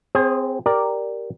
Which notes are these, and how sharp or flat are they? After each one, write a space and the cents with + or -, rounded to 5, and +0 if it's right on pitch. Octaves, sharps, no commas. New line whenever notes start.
C4 -15 G#4 -5 C5 +40
G4 +0 A#4 +0 D5 +0